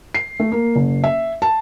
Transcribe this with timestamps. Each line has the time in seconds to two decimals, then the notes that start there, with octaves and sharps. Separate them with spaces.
0.14 C7
0.40 A3
0.52 A#3
0.76 F#1
1.04 E5
1.42 A5